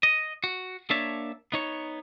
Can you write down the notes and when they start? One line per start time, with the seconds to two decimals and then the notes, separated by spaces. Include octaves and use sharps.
0.03 D#5
0.44 F#4
0.90 A#3 D4 C#5 E5 A5
1.52 B3 D#4 C#5